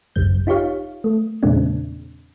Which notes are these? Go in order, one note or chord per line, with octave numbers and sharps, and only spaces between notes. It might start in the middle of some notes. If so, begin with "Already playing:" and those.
G#1 C#2 F#2 G6
D#4 F4 G4 C#5 F5
A3
E2 A#2 C#3 G#3 C4 D4